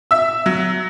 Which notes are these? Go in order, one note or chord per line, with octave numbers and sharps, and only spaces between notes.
E5 E6
F#3